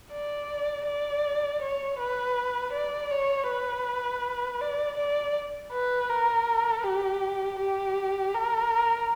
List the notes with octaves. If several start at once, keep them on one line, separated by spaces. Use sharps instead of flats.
D5
D5
C#5
B4
D5
C#5
B4
D5
D5
B4
A#4
G4
G4
A#4